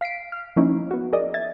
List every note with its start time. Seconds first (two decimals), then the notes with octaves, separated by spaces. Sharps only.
0.01 F5 B6 C7 D7
0.32 F6
0.56 F3 A#3 C#4 D#4 E4
0.91 B3 F#4
1.13 G#4 A#4 D5 D#5
1.34 E5 G#6 A6